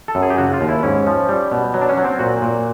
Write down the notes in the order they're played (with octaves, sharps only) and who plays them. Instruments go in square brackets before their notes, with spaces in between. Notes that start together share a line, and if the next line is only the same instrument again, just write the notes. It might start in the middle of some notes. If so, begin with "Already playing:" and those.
[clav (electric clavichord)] A4
F#2
G#4
G4
C#3 F#4
F4
D#2
E4
G#2 C#4
F3
G3
B2
F#3
D4
C#4
F#3
C4
A#2 F#4
A#2